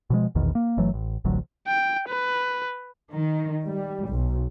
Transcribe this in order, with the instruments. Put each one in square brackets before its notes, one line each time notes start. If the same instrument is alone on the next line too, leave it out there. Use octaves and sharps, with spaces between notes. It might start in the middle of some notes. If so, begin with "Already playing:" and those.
[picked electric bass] B2 F3 G#3
A#1 E2 B2 D#3
A#3
G1 E3 F#3 A3
A1
D1 A1 D2 F#3
[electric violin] G5
B4
[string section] D#3
G3
B1